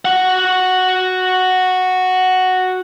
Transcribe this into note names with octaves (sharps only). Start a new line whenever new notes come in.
F#4 F#5